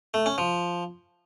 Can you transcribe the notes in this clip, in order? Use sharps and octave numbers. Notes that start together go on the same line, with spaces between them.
A3
C#4
F3